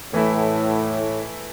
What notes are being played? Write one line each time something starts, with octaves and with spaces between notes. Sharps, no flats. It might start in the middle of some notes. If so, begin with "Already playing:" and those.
A2 E3 A3 E4